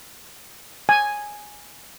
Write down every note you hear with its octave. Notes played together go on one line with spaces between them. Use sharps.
G#5